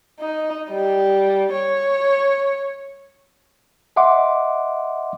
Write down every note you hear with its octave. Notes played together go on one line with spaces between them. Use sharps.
D#4
G3
C#5
D#5 E5 F#5 C6 D6